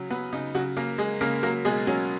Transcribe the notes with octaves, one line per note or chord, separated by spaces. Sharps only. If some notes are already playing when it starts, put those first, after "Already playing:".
Already playing: C#3 F#3
F#3 B3 B4
C#3 D#4
C#3 F#3 F#4
C#3 A#3 A#4
G#3 G#4
C#3 A#3 A#4
F#3 A#3 A#4
B2 G#3 G#4
F#3 C#4